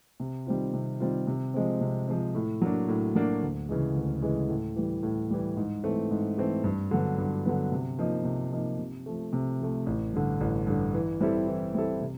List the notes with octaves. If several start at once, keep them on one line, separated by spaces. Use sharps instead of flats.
C3
D#3 G3 C4 F4
C3
D#3 G3 C4 F4
C3
F3 G#3 C4
C3
F3 G#3 C4
A2
F#3 A#3 D4
A2
F#3 A#3 D4
D2
C#3 E3 G#3
D2
C#3 E3 G#3
A2
E3 G3
A2
E3 G3
G#2
E3 A3 C4
G#2
E3 A3 C4
G2
D3 F#3 B3
G2
D3 F#3 B3
C3
F3 A#3 D#4
C3
F3 A#3 D#4
C3
F3 A3
C3
F3 A3
A1
G2 D3
A1
G2 D3
E3
G3 C4 E4 A4
E3
G3 C4 E4 A4
C3